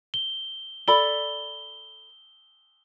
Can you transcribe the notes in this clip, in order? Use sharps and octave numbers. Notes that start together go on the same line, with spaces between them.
G7
A4 D5 B5 G7